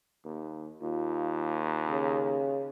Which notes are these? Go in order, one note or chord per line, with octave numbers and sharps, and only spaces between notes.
D#2
D#2 F4
C#3